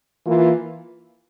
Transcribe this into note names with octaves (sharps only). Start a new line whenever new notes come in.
E3 A#3 F4